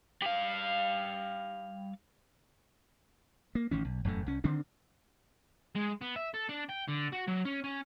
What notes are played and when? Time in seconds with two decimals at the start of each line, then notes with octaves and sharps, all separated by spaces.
0.22 G3 F5
3.55 A#3
3.71 A1 D#3 C#4
3.85 B1
4.05 E1 F#2 A2 A3
4.26 C2 C#4
4.44 D3 D#3 C4 D4
5.76 G#3
6.02 B3
6.16 E5
6.34 A4
6.49 D4
6.69 G5
6.88 D3
7.12 F#4
7.27 F#3
7.45 C#4
7.64 C#4